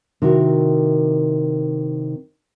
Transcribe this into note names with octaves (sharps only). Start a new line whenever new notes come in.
C3 D#3 E4 F#4 A#4